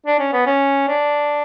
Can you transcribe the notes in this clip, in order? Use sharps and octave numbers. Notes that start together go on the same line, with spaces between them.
D4
C#4
B3
C#4
D4